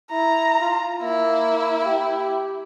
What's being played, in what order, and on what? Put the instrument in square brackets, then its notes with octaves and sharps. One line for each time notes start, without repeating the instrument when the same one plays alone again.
[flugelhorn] E4 [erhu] A#5
[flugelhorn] F4
[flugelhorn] A#3 [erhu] E4
[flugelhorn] G4